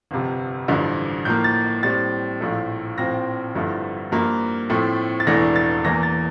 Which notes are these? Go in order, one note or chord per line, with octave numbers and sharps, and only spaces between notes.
G1 F2 C3
A1 G2 D3 F3
A2 F3 A#3 G6
A6
A2 G3 C4 A6
A#1 A2 F3 A3
A#1 A2 F3 C4 A#6
G1 G2 F3 A3 E4
G2 F3 A#3
A2 F3 A3 C4
A6
E1 E2 E3 A3 D4 A#6
A6
E2 E3 A#3 A#6
A6